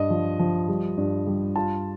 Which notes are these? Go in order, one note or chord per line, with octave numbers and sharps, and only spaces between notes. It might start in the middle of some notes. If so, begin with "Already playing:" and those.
Already playing: G2 D#5
F3
F3
G3
G2
G3
F4 A5